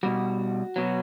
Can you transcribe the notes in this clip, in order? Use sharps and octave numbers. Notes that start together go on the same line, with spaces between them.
B2 G3 F#4
B2 F#3